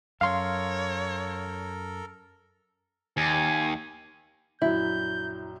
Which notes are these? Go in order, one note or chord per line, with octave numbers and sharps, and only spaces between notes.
F#2 A4 A#4 C#5 F5 C6
D#2 G#5
A#1 F#2 F#3 E4 G6